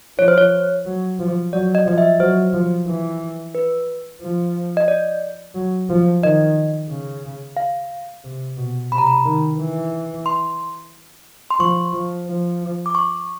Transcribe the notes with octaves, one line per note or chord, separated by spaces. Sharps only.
F3 C#5
C5
C#5
F#3
F3
F#3 D5
D#5
F3 D#5
E5
F#3 C5
F3
E3
B4
F3
D#5
D5
F#3
F3
D#3 D#5
C#3
F5
C3
B2
C3 B5
A#5
B5
D#3
E3
C6
C6
F3 C#6
F3
F3
D6
C#6